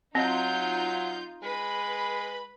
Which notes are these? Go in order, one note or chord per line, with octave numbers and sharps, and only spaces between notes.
F#3 C4 D#4 F4 D#5 G6
G#3 B4 B5